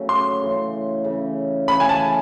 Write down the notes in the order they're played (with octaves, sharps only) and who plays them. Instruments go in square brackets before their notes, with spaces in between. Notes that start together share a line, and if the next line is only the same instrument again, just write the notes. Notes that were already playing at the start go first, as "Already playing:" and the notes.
Already playing: [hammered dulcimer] C#3 F#3 A3
[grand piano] C6
[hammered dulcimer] C#3 E3 A3
C#3 E3 A3
[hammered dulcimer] C#3 E3 A3 C#4 [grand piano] B5
[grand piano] G#5
A5